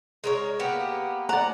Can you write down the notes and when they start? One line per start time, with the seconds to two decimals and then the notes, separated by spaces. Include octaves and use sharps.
0.24 G#3 A#4 C#5
0.59 A#3 B3 G4
1.29 D5 F#5 A#5